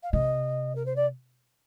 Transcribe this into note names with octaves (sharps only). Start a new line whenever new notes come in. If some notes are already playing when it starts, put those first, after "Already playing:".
F5
C3 D#5
A#4
C5
D5